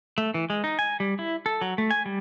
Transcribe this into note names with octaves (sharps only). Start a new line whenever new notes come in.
A3
E3
G#3
D#4
G#5
G3
E4
A4
F#3
A3
G#5
G3